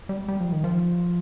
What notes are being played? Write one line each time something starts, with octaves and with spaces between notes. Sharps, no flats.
G3
G3
F3
D#3
F3